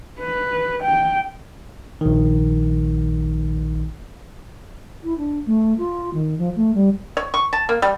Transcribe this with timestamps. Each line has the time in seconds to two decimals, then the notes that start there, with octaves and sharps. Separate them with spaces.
0.20 B4
0.83 G5
2.01 A#1 D#3
5.03 E4
5.17 D4
5.46 A3
5.78 F4
6.13 D#3
6.38 F3
6.55 A3
6.74 G3
7.17 C#5
7.34 C#6
7.53 A5
7.69 A#3
7.82 G3